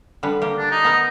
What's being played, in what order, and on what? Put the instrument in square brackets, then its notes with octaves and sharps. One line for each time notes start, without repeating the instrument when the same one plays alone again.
[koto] D3 G3 B4
A#3 G4
[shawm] D4
D#4
[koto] B3 A#4